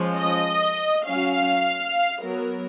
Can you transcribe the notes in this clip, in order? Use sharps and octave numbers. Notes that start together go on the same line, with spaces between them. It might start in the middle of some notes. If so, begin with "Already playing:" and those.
Already playing: F3 G#3 C#4
D#5
F#3 C#4 F5
F#3 B3 A#4